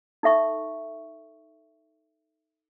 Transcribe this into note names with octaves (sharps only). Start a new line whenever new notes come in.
D#4 A4 E5 C#6